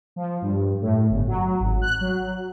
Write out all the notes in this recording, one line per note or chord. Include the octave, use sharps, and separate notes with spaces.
F3
G2
A2
G1
F#3
G#1
F#6
F#3